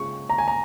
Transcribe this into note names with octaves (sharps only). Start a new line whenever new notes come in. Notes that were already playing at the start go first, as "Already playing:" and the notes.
Already playing: C#3 G#3 F4 C#6
A#5
G#5
A#5